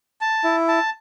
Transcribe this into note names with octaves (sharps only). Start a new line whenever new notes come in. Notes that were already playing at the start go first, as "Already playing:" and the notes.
A5
E4
A5